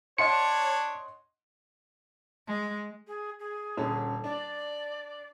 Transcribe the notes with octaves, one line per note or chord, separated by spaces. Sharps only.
D4 C#5 D#5 F#5 C6 C#7
G#3
G#4
G#4
D#1 D3 C#4
D4 D5